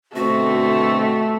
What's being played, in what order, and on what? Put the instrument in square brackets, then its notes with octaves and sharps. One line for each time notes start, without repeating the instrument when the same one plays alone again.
[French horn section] B2 D3 C4 [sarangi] A3 [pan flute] F#4